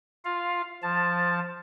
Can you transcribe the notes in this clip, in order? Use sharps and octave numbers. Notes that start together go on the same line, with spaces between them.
F4 F5
F3 A5